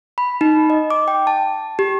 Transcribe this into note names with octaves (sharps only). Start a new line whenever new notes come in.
B5
D#4
D#5
D6
G5
A5
G4